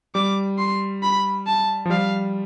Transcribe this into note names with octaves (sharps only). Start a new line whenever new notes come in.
G3 D6
C6
B5
A5
F3
G3 F5